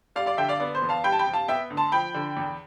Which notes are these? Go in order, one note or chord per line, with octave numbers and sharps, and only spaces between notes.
G3 D5 F5
D5 F5
D3 E5 G5
D5 F5
B3 D5
C5
E2
F5 A5
G3 G5 B5
A5
G5 B5
C3
F5 A5
B3 E5 G5
D2
A5 C6
F3 G5 B5
D3
E2